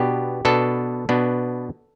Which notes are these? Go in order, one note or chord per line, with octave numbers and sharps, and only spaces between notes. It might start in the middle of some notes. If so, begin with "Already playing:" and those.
Already playing: B2 B3 D4 G4
B2 B3 D4 A4
B2 B3 D4